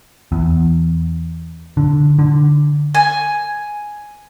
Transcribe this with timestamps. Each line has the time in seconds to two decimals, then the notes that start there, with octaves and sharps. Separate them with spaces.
0.32 E2
1.77 D3
2.19 D3
2.95 G#5